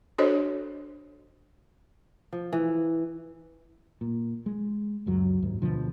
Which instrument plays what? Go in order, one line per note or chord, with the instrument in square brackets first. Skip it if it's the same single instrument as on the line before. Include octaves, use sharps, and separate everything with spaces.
[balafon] D4 F#4 A4 C5 C#5 D#5
[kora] F3
E3
[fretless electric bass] A#2
G#3
C#2 F#2 F#3
D#2 G#2
D2 B2 D3 F3